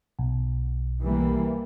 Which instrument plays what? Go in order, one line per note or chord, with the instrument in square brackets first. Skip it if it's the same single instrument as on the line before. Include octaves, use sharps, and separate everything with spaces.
[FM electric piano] B1
[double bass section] E3 G3 A#3